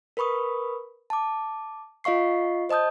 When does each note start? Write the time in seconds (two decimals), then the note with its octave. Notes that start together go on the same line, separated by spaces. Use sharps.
0.17 A#4 B4 B5 C#6 D#6
1.10 A5 D6
2.04 F4 D#5 F5 C#6 C7
2.69 C5 D#5 A5 D#6 G6